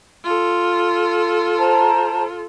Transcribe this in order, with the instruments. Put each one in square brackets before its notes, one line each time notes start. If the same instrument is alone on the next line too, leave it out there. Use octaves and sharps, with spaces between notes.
[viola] F4 A4
[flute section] C5 A5 A#5